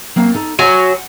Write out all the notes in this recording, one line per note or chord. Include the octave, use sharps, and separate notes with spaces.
F#3 A#3 C4
D#4 A4
F#3 C5 F#5 G#5